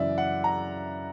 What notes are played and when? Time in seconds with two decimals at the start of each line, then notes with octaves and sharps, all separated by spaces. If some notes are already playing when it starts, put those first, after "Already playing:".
Already playing: F#2 C#3 E3 D5 E5
0.18 F#5
0.44 A#5